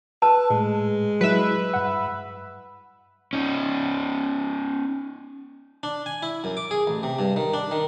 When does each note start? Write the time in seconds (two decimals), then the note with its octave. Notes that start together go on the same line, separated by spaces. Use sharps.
0.22 B4 A5 E6
0.50 A2 G#3
1.21 F#3 E4 B4 E5
1.74 G2 F#5
3.33 C#4 D#4
5.83 D4
6.06 G#5
6.23 E4
6.44 F#2
6.57 D6
6.71 G#4
6.87 A1
7.03 C3
7.19 G2
7.36 D#3
7.54 D4
7.71 D#3